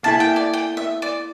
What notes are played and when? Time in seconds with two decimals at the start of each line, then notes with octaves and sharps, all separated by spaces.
0.03 A#3 E4 A4 A5
0.20 G5
0.36 D5
0.53 G5
0.77 E5
1.02 D5